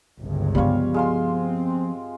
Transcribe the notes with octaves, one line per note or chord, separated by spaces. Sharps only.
G1 C#2 G2
F3 G3 B3 F4 C#5
G#3 F4 C6
C4